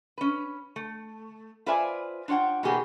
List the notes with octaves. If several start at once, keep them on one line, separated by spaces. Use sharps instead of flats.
C#4 B4
A3
F4 B4 C5 D5 E5 G#5
D4 F4 C#5 F#5 G5
B2 E3 A#3 B3 G4 G#4